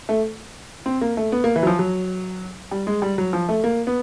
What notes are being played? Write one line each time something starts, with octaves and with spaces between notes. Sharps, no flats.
A3
C4
A#3
A3
B3
A#3
E3
F#3
F3
F#3
G3
G#3
G3
F#3
F3
A3
A#3
B3